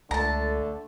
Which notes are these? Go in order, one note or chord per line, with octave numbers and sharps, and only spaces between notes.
C#2 D3 A3 A5 A#5